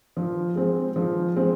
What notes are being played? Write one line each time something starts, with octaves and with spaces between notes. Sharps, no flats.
F3
G#3 C4
F3
G#3 C4